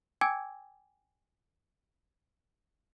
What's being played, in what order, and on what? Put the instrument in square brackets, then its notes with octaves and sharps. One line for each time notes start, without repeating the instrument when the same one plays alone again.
[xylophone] G5 G#5 D6 E6 G#6